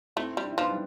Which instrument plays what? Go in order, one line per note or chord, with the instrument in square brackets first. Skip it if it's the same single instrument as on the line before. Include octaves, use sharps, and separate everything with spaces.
[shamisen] A3 [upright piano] C4 E4
[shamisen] G3
[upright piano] D4
E4
[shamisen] F3 [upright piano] B3 D4
[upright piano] G3